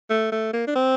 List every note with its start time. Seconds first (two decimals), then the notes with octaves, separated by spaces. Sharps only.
0.10 A3
0.32 A3
0.54 A#3
0.67 D4
0.76 C4